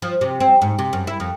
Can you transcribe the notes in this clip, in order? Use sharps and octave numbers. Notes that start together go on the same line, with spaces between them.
F3
C3
C4
G#2
C3
F#2
E4
F2